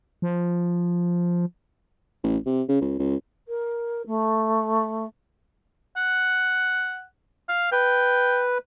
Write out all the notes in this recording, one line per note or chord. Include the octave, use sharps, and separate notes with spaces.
F3
A1
C3
C#3
C#2
C#2
A#4
A3
F#5
F5
B4 G5